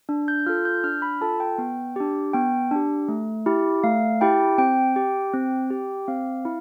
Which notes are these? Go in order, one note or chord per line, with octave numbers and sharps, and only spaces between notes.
D4
G6
F4 A4 F6
G6
D4 F6
B5
F4 A4 A5
G5
B3
D4 G4
B3 G5
D4 G4
A3
E4 G4
A3 F5
E4 G4 G5
C4 G5
G4
C4
G4
C4 F5
E4